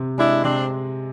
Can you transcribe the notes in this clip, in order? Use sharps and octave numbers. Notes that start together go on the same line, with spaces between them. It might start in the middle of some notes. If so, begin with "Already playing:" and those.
Already playing: C3 C4
G#3 D4 E4
C3 C4 D4